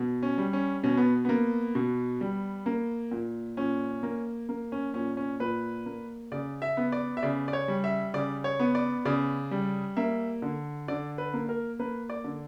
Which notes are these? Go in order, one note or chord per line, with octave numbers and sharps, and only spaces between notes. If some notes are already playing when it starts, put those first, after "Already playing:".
Already playing: B2
C#4
G3
C#4
B2 C#4
B3
A#3 B3
B2
G3
A#3
A#2
A#2 C#4
A#3
A#3
C#4
A#2 C#4
C#4
A#2 B4
A#3
C#3 D5
E5
B3
D5
E5
C#3 D5
D5
C#5
G3
E5
C#3 D5
C#5
B3
D5
C#3 D5
G3
A#3 E5
D3
D3 D5
B4
A#3
A#4
A#3 B4
D5
D3